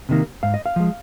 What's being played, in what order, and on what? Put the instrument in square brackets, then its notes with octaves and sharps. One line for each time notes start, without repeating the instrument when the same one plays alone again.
[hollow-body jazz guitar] C3 D#3 A#3
G#2 F5
D#5
F5
F3 G#3